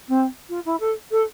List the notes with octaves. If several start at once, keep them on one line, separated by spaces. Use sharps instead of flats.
C4
F4
E4
A4
A4